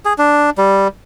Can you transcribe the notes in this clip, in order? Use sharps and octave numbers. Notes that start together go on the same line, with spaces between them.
G#4
D4
G3